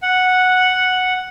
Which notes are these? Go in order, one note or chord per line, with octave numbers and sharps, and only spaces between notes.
F#5